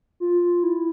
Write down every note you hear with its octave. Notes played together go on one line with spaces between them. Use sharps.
F4
E4